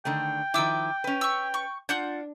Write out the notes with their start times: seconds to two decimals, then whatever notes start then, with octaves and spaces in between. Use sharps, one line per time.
0.05 D3 D#3 A3 G5
0.54 D#3 F3 E4 D6 E6
1.04 C#4 B4
1.21 C#6 E6
1.54 C#6
1.89 D4 F4 F#5 G6